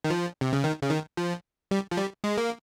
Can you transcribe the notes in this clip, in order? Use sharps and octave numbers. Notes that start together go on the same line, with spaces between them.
D#3
F3
C3
C#3
D#3
C#3
D#3
F3
G3
F3
G3
G#3
A#3